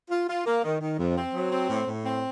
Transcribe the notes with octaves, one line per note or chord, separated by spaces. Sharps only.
F4
F4
A#3
D#3
D#3
F2
C4
F#3
C4
A2
A2
C4